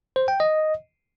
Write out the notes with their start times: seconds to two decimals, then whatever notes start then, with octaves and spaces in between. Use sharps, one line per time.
0.16 C5
0.28 G5
0.40 D#5